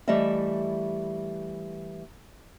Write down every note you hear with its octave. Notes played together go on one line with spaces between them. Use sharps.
E3 G3 A3 E4 D#5 E5